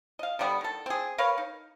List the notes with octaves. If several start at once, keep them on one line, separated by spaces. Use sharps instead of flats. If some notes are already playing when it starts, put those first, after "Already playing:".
D#5 F5
D3 F#3 G3 B3
D#3 A4
C4 G#4
A#4 B4 C#5 F5
D#4